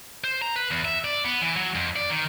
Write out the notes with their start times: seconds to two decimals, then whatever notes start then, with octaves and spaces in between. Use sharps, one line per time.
0.24 C5
0.42 A#5
0.56 B4
0.71 E2
0.85 E5
1.04 D5
1.24 B3
1.41 E3
1.56 F#3
1.75 F2
1.96 D5
2.10 D#3